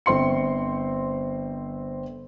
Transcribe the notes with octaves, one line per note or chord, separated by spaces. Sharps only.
G1 C4 C6 C#7